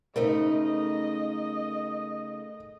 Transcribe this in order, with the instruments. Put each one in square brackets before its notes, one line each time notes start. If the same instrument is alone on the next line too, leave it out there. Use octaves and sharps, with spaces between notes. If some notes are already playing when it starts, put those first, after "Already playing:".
[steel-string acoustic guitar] C#3 A3 D#4 [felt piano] A#4 C5 [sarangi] D#5